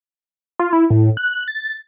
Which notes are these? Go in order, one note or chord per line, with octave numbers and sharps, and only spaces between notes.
F4
E4
A2
F#6
A6